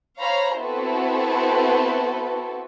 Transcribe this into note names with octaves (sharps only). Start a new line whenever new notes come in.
C5 C#5 F5 A#5 B5
B3 C4 E4 F#4 A4 B4